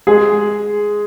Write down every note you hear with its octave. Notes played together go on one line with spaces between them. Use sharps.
G#3 G#4